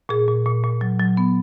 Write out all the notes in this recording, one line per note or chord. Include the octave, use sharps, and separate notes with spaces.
A#2 G#4
A#2
A#2
A#2
F#3
F#3
B3